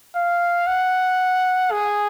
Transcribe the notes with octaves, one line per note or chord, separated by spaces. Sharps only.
F5
F#5
G#4